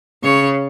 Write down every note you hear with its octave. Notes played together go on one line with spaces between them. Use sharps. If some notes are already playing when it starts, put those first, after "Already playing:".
C#3 C#5